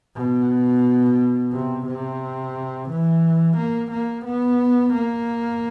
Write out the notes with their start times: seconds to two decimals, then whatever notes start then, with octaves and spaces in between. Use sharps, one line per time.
0.16 B2
1.53 C3
1.86 C3
2.89 E3
3.57 A#3
3.91 A#3
4.25 B3
4.93 A#3